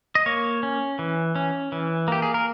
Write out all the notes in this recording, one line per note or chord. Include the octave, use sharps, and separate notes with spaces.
D#5
A#3 C#5
C#4
E3
C#4
E3
A#3 G4
G#4
A#4